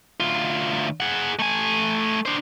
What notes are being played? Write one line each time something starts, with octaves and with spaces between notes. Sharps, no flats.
D2 F4
G#4 F#5
A3 G#5
D4 C5